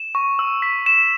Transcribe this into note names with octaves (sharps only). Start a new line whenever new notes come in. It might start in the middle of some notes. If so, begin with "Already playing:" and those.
Already playing: E7
C#6
E6
B6
E7